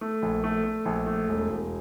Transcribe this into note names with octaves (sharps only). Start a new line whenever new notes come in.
A3
A#1
A3
A3
A#1
A3
E1
E1